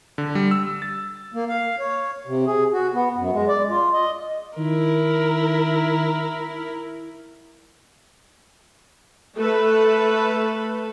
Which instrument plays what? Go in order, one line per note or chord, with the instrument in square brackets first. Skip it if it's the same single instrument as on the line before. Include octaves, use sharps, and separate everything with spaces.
[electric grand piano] D3
G3
E6
A6
[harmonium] A#3
F5
C#5
C3
G#4
F#4
B3
F#2
G#3
D5
F4
D#5
[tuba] D#3 [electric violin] E4 A#4
[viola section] A3 A4 B4